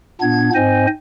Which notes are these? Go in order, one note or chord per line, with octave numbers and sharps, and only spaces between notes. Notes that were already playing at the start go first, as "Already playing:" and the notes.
A#2 B3 D4 G#6
G#2 C4 C5 D#5 G#5